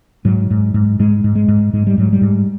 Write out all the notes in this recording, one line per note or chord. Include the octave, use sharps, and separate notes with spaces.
G#2 F#3
G#2
G#2
G#2 G#3
G#2
G#3
G#2
G#2 G#3
G3
G#2 F#3
G3
G#2